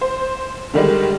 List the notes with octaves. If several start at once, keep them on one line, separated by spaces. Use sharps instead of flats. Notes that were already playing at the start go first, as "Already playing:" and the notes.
C5
D3 D#3 G3 G#3